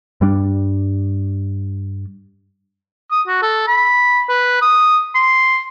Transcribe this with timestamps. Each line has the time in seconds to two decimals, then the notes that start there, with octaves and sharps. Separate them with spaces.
0.21 G2 G3 D4
3.11 D#6
3.27 F#4
3.42 A4
3.68 B5
4.29 B4
4.62 D#6
5.14 C6